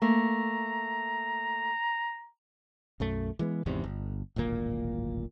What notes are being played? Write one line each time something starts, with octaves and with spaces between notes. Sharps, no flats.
A3 A#3 A#5
B1 F#2 A3
E3 G#3 B3
G#1 E2 G#2 C3
G1
D1 G#1 A#2 A#3